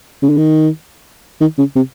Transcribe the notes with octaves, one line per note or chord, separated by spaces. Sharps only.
C#3
D3
D#3
D#3
C#3
C3